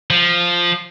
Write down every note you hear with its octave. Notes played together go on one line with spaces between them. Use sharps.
F3